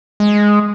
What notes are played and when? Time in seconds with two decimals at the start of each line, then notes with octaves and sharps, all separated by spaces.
0.20 G#3